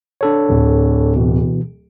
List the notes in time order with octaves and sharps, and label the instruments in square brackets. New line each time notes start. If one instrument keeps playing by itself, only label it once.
[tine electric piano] D4 A4 C#5
[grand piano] D1
[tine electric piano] B2 E3